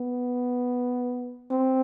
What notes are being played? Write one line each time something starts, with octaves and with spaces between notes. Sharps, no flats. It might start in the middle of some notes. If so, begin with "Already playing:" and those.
Already playing: B3
C4